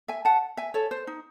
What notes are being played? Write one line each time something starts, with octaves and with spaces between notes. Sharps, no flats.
E5 G#5
F#5 A5
E5 G#5
A4 C#5
C5
D#4